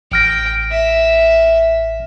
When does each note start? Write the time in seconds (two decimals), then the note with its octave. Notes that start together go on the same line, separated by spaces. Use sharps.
0.12 A1 G5 F6 A#6
0.71 E5